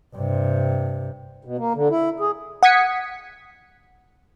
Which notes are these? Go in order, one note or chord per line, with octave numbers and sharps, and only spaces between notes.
G2 C3
B2
A#3
D3
E4
G#4
F#5 D#6 G#6 B6 C#7